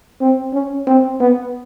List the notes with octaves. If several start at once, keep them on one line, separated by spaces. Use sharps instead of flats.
C4
C#4
C4
B3